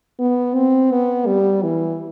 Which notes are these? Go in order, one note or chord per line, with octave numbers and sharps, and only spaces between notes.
B3
C4
B3
G3
E3